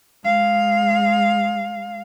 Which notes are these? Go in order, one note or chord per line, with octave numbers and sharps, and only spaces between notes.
G#3 F5